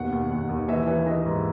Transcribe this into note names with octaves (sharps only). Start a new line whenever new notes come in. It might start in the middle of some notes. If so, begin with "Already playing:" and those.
Already playing: D#2 B2 F#5
D#2
D#2 F#5
D#2
E3 E5
E3
E3 D#5
G#2